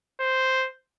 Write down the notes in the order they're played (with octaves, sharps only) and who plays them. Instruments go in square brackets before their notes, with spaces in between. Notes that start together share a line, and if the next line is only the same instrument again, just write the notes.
[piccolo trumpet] C5